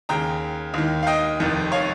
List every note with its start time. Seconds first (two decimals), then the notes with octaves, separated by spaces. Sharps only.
0.09 D#2 C#3 G5 A#5
0.74 D#2 D#3
1.03 F5
1.07 D#5 G5
1.40 F1 F2 D#3
1.72 C#5 F5